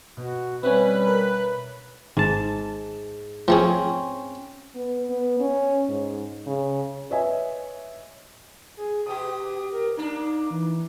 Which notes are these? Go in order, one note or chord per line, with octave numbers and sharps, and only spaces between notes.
B2 F#4
G3 C4 C#4 B4 C#5 E5 G#5
A#4
G#1 G#2 A5
F3 A3 C4 C#4 G#4
B3
B3
C#4
G#2
C#3
B4 C#5 D#5 E5 G#5
G#4
B2 G4 D#6
A#4
A#3 D4 D#4
E3